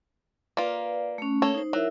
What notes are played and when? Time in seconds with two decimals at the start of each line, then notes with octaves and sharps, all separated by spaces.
0.57 A#3 F4 B4 D5
1.18 A3 C#4
1.42 A#3 A4 C#5
1.55 D#4 C5
1.73 F#3 E4 A#4 E5